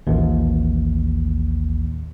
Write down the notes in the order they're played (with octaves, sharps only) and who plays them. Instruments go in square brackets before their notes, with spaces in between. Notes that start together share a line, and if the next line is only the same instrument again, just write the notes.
[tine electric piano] A1 D#2